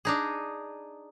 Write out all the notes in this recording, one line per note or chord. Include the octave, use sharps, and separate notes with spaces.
D4 D#4 G#4